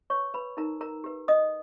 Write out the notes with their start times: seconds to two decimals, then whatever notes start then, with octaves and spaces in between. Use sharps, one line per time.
0.10 B4 C#5 C#6
0.34 B4 B5
0.57 D#4 A#4 A#5
0.81 A#4 A#5
1.04 G4 B4
1.28 D#5 D#6